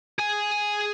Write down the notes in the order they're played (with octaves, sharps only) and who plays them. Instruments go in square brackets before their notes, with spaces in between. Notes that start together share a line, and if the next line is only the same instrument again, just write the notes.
[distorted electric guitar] G#4 G#5